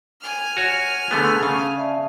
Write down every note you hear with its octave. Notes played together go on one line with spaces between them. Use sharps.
G#5 F6
F#4 C#5
D3 A3 B3 G#4
C#3
D5 E5 A5